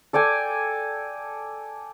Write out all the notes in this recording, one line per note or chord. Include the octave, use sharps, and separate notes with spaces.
A4 D5 G5 G#5